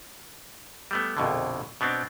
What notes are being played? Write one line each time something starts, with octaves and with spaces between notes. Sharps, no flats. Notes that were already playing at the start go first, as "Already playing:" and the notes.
G3 A3 B3
A#1 F2 B2 D3
B2 B3 C4 D4